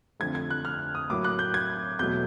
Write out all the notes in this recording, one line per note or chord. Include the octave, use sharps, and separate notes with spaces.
F2 D3 F3 A3 G#6
G#6
F#6
F6
D#6
A2 F#3 A#3 D6
F#6
G6
G#6
E2 B2 F#3 A3 G6